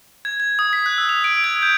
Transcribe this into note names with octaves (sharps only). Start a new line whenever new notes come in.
G#6
G#6
D#6
B6
F#6
E6
F7
D7
G#6
G6